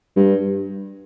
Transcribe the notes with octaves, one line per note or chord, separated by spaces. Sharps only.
G2